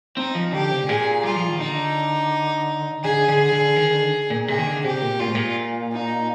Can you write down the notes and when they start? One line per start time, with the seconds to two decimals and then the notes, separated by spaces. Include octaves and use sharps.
0.17 C4 D#4
0.35 F3
0.53 D3 G4
0.71 C3
0.82 G#2
0.88 A#2 G#4
1.24 G3 F4
1.36 F3
1.48 D#3
1.60 D3 D#4
3.04 D3 G#4
3.28 D3
3.52 D3
3.76 D#3
3.94 D3
4.30 A#2
4.48 C3 G#4
4.58 D#3
4.66 D3
4.84 C3 G4
5.02 A#2
5.20 A#2 F4
5.27 G#2
5.35 A#2
5.92 D#4